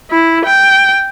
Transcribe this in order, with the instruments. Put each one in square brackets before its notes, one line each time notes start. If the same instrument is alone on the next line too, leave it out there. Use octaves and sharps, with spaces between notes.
[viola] E4
G5